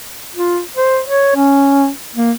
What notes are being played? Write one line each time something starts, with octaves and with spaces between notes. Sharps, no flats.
F4
C5
C#5
C#4
A#3